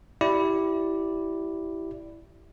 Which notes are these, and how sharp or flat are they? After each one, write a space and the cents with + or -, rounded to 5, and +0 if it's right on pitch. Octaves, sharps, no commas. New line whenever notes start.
E4 +0 G4 -20 D5 +0